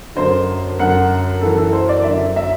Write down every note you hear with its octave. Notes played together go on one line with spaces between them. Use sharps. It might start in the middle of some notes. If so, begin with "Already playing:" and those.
F#2 D3 C5
F#2 D3 F#5
F#2 E3 A4
A4
C5
D5
F#2 D3 E5
E5